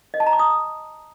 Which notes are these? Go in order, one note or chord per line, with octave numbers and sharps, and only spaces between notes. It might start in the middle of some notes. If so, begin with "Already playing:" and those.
D#5
A5
A#5
D6
D#6